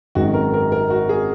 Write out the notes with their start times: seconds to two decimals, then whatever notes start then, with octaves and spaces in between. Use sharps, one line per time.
0.15 G#1 F#2 D#3 G#3 F#4
0.34 A#4
0.54 A#4
0.72 A#4
0.90 F#4
1.09 G#4